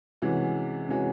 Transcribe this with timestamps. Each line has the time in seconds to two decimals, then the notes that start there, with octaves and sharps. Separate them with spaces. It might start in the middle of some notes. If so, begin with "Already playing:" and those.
0.22 C3 E3 G#3 C#4 F#4
0.89 C3 E3 G#3 C#4 F#4